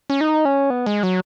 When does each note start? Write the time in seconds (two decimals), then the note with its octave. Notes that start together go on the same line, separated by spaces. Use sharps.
0.10 C#4
0.21 D#4
0.45 C#4
0.70 B3
0.86 G#3
1.03 F#3